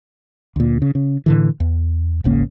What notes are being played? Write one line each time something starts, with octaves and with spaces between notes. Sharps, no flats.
D2 A#2
C#3
C#3
A2 D3 E3
E2
D#1 G#1 C#3 A#3